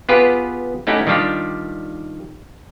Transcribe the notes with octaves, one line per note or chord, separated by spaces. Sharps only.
B3 F4 G4 G#4 B4
A3 C#4 D#4 E4 G4 F#5
D#3 G3 D4 F4 G4